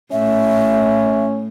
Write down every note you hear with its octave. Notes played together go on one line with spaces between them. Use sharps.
A2 C#4 E5